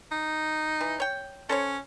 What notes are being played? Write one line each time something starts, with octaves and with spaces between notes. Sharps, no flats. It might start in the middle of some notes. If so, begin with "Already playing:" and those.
D#4
E3
C#5 G5
C#4 A4 C5 C#5